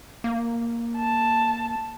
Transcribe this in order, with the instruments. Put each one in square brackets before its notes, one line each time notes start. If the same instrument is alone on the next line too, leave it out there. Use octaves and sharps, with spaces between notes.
[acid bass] A#3
[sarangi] A5